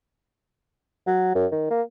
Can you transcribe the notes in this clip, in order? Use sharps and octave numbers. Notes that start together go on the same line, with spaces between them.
F#3
F#2
D#3
A#3